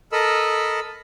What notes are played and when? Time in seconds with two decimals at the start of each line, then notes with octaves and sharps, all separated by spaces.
0.12 A4 A#4 D#5 B5 E6